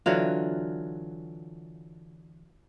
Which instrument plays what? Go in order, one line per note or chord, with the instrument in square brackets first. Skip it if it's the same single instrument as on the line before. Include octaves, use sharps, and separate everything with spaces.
[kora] D3 E3 F#3 F4